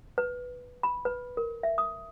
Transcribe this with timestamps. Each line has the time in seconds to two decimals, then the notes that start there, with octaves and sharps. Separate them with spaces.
0.18 B4
0.83 B5
1.05 B4
1.37 A#4
1.63 E5
1.78 D#6